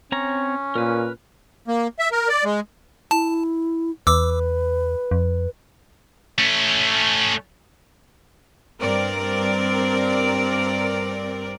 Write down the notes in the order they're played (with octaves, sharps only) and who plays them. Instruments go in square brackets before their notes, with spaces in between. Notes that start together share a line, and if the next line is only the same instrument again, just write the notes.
[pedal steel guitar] C4 C#5 A#5 [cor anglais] C#4
[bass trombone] A#2 [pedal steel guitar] A#4 B4
[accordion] A#3
E5
A#4
D5
G#3
[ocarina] E4 [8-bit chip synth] A5
[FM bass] E2 [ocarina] B4 [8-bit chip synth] D6 E6
[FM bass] F2
[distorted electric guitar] A3 C#4
[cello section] G2 C4 A#4 D5